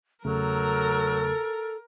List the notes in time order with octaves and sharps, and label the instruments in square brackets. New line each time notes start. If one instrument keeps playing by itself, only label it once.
[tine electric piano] E2 C#3 A3 [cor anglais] F#3 [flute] A4 [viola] A#4